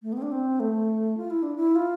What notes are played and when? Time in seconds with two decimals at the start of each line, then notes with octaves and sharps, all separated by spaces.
0.03 A3
0.13 B3
0.17 C4
0.22 D4
0.32 C4
0.60 A3
1.17 F4
1.30 E4
1.43 D4
1.56 E4
1.76 F4